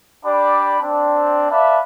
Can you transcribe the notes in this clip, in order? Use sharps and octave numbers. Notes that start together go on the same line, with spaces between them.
D4 G4 D5 B5
C4 D4
B4 D5 E5 F5 A5 B5